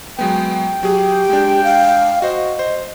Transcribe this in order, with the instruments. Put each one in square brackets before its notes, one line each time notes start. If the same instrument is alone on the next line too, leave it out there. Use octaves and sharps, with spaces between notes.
[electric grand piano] F#3 G#3 B3 [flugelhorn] G5
[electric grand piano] F#3 G#4 [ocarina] G4
[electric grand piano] G#3 D4
[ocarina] F5
[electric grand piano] F#4 C5 [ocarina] D#5
[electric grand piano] C5